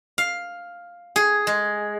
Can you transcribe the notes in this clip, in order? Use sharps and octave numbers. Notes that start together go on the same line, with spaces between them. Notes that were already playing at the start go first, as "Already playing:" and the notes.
F5
G#4
G#3